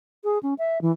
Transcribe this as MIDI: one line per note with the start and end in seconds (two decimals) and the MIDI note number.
0.24 0.38 68
0.43 0.54 61
0.58 0.81 76
0.82 0.92 52